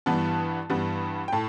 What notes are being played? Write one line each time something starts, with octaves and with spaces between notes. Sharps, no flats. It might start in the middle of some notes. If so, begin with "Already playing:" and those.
G2 E3 G3 B3 A5
G2 E3 G3 B3
G5
A2 A5